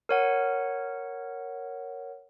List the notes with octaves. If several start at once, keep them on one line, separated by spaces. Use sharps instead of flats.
A#4 C#5 F#5